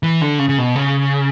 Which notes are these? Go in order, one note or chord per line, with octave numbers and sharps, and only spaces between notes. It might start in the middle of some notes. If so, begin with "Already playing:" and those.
E3
D3
C#3
C#3
B2
C#3